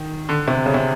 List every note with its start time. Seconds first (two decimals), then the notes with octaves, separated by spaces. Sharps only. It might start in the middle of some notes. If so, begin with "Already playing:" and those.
Already playing: D#3
0.29 D3
0.48 C3
0.66 C#3
0.74 C3